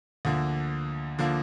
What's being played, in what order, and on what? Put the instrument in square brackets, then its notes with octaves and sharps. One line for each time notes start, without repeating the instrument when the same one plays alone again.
[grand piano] D2 D3 F3 A#3
D3 F3 A#3